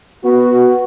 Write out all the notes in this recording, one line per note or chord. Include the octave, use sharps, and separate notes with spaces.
B3 F#4